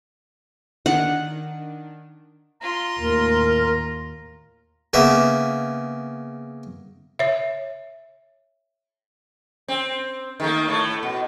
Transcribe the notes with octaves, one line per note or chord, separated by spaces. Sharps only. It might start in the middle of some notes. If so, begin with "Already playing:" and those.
D#3 D4 F#5
F4 A#5 C6
D#2 A2 A#4
C#3 A#3 B3 E5
C#5 E5
C4
D#3 A3 A#3
A2 A3
B2